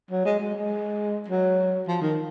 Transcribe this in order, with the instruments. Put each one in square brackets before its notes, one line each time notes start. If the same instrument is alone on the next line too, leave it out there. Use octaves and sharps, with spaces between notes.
[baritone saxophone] F#3
G#3
G#3
G#3
F#3
F3
D#3